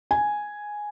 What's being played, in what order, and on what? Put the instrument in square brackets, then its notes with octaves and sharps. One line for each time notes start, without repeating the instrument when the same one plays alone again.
[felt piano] G#5